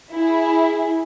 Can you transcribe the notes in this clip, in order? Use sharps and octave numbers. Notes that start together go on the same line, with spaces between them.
E4 G#4